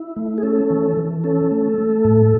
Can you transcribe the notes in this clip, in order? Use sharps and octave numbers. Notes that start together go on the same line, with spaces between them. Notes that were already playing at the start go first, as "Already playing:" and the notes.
Already playing: E4
A3
G#4
C#4 A4
E3
E3
C#4 A4
A3
A3
A2